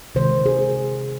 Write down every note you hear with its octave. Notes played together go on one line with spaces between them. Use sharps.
C3 D#3 G#3 C5
G#4